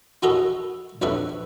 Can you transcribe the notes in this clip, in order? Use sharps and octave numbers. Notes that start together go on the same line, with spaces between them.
E4 F#4 A4 A#4 D#5 E5
A#1 F2 A3 D4 B4 E5